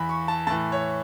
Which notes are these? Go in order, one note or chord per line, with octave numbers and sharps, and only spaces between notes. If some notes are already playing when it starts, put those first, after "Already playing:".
Already playing: E2 E3 B5
C#6
A5
A2 E3 A5
C#5